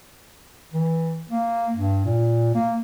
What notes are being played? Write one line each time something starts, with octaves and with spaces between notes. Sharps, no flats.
E3
A#3
G2
A#2
A#3